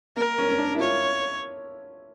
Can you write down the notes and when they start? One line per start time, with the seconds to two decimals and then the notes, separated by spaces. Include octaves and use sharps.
0.17 A#3 A#4
0.38 C#4
0.49 C#4
0.58 D4
0.75 E4
0.80 F4 C#5